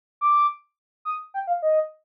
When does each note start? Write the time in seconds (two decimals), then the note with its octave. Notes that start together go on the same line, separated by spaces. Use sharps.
0.21 D6
1.05 D#6
1.34 G5
1.47 F5
1.62 D#5